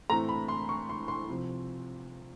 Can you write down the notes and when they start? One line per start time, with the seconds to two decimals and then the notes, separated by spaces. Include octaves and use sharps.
0.10 A2 E3 A3 C4 A#5
0.29 B5
0.48 C6
0.69 C#6
0.89 C6
1.08 C6
1.30 C3 F3